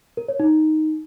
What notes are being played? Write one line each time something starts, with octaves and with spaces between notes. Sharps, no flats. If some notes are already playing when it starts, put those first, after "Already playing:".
A#4
C#5
D#4